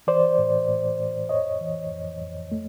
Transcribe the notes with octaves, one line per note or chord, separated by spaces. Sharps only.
E3 C5 D5
A2
A2
A2
F2 C#5 D#5
E3
F2
F2
A3